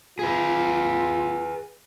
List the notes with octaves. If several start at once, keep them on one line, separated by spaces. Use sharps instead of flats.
F4 G#4 B4